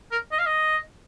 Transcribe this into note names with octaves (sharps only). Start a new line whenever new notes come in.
A#4
D#5
F5
D#5